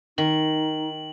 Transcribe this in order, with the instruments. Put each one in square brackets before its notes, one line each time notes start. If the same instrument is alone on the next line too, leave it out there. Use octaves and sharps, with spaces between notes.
[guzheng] D#3 [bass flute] D#4 [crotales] F#7